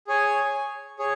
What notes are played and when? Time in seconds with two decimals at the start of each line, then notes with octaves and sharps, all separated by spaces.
0.07 G#4 C#5 G#5
0.99 G#4 C#5